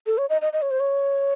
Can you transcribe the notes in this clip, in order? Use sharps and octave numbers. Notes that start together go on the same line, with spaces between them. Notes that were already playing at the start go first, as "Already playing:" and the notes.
A4
C#5
D#5
D#5
D#5
C#5
C5
C#5